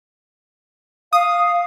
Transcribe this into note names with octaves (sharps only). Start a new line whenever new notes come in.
F5 D#6